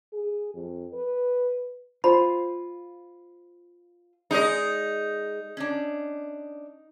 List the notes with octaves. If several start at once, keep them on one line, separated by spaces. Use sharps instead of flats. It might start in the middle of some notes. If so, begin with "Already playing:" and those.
G#4
F2
B4
F4 C5 B5
G#3 D#4 G#4 D#5
C#4 D4